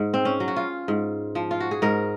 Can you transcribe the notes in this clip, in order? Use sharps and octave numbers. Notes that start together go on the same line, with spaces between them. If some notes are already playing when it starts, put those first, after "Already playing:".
Already playing: G#2
C4
C#4
F#3
F#4
F4
G#2
F3
F4
F#4
G#4
G#2 A#4